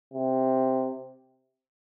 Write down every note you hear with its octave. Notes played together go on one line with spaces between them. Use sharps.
C3